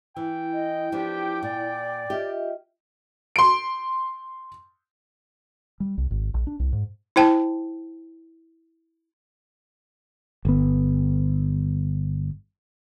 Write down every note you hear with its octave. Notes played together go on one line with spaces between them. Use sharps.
E3 E4 G5
D#5
F3 B3 D4 G4
A#2 D5
F4 G4 D#5 E5
C6 D7
G3
C2
G#1
A#1
D4
C2
G#2
E4 C5 G5 A5
G1 B3